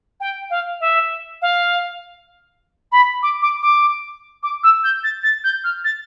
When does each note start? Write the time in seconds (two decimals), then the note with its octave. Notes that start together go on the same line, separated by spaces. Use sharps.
0.20 G5
0.50 F5
0.80 E5
1.41 F5
2.91 B5
3.22 D6
3.42 D6
3.62 D6
4.42 D6
4.63 E6
4.83 G6
5.03 A6
5.23 A6
5.43 G6
5.63 F6
5.84 A6